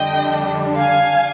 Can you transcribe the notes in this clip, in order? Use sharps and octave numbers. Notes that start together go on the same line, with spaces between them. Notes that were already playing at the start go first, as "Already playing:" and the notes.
Already playing: F2 D3 G3 D4 D#5 G5
F5 G#5